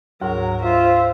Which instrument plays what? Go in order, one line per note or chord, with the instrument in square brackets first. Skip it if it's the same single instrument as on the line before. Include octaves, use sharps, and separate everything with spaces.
[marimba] D2 G#2 [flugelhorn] F#3 [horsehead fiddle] A#4
[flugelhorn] F4 [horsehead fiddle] C5 E5